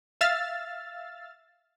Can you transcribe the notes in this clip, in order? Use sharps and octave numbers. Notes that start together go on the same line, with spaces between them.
E5 F5 E6 F6 A6